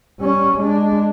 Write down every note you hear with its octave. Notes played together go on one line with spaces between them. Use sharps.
G3 C#4
G#3 D4